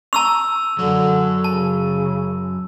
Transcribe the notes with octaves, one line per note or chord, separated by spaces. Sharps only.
A5 A#5 C#6 E6 F7
F#2 D3 F#3
C#3 A5